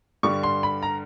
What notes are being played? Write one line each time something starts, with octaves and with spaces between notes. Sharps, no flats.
G2 D3 G3 C#6
C6
B5
A#5